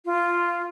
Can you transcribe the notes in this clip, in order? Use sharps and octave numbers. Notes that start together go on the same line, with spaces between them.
F4